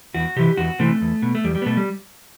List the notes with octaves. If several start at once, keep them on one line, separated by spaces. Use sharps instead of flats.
E2 F#4
C3 E3 G4
E2 F#4
C3 E3 A3
E2
B2
A3
E2 G3
G3
B3
B2 A3
G3